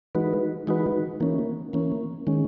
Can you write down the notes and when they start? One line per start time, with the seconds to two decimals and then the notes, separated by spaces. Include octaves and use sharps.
0.15 E3 G#3 D#4 F#4 B4
0.67 E3 G#3 D#4 F#4 B4
1.20 E3 A#3 C#4
1.73 E3 A#3 C#4
2.27 D#3 G#3 C#4